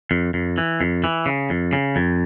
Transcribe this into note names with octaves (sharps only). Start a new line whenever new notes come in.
F2
F2
E3
F2
E3
C#3
F2
C#3
F2